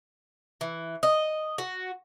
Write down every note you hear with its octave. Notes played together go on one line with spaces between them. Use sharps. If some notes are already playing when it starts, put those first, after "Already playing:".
E3
D#5
F#4